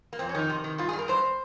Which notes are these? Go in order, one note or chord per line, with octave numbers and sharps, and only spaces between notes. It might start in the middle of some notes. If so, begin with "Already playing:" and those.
A#3
F2 C4
C#4
D#3 D#4
C3
D#3
G2 F4
G#4
G2
A#4
G2 C5